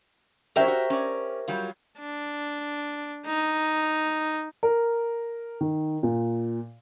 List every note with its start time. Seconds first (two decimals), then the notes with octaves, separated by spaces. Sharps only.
0.56 F#3 C#4 E4 G4 A#4 C5 E5 G5
0.68 F#4
0.90 C#4 D5
1.48 F#3 G3 F4
2.00 D4
3.26 D#4
4.63 A#4
5.61 D#3
6.03 A#2